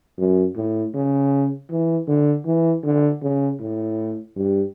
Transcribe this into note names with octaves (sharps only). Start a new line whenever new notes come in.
F#2
A2
C#3
E3
D3
E3
D3
C#3
A2
G2